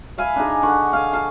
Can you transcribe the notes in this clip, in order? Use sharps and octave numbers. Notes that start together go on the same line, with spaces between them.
E5 F5 G#5 B5
D4 D#4 G#4
D3 F#5 C#6
F5 G#5
F5 A5